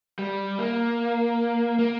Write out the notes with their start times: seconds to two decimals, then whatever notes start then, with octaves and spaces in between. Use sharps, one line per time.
0.19 G3
0.59 A#3
1.79 A#3